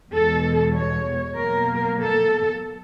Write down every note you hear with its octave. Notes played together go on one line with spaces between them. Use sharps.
E2 B2 G#3 A4
C#5
B2 F#3 A#3 A#4
A4